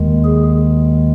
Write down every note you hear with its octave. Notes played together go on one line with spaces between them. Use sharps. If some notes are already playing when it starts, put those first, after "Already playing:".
Already playing: D#2 D#3 G#3
G#4